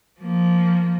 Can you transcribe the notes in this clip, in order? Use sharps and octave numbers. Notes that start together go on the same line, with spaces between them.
F3 A#3